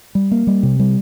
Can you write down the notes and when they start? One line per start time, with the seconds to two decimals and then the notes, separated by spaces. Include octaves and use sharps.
0.15 G3
0.31 A#3
0.47 G3
0.63 C3
0.79 G3